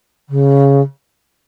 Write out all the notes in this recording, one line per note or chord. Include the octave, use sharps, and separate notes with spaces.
C#3